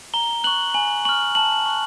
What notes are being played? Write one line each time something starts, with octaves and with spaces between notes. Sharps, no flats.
A#5 G7
C#6 F#6 F#7
G#5 F#7
C#6 F6 F#7
A5 F#7
C#6 F#6